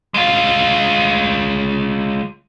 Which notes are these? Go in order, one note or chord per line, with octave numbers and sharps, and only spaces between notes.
G#3 F4